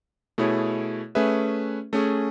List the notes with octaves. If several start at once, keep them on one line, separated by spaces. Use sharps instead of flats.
B2 A3 E4 G#4 C#5
A3 C#4 G#4 B4 E5
A3 C#4 G#4